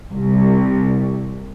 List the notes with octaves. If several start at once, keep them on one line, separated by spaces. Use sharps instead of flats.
C2